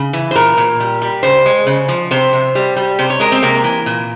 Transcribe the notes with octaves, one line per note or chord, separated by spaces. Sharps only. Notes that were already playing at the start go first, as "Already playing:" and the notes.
Already playing: C#3
E3
C5
A#2 A#4
A#2
G3
G3
C#3 C5
G#3
C#3
F3
C3 C5
C3
G3
G3
C3 C5
C#5
G#3 A#4
C4
C3 A#3
E3
A#2